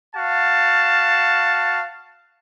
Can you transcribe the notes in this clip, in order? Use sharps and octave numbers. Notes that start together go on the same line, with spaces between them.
F#4 F5 A5